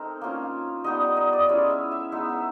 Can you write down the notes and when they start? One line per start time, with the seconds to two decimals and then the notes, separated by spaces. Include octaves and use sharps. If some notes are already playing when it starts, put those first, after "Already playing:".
Already playing: A3 C4 D#4 A#4
0.21 A#3 C#4 F4
0.84 G3 B3 D#4 D#5
1.01 D#5
1.17 D#5
1.33 D5
1.49 G#3 C#4 E4 D#5
1.70 E5
1.92 E5
2.12 G#3 B3 D#4 E5
2.29 E5